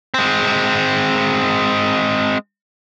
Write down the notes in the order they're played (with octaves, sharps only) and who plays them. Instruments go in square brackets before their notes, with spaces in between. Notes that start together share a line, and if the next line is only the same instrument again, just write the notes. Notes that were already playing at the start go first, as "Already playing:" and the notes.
[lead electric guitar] G#3 C4